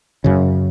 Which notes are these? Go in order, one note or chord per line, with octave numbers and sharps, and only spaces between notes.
F#2 C#3